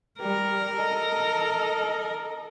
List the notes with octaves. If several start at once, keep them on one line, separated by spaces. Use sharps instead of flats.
G3 A#4
A4 D#5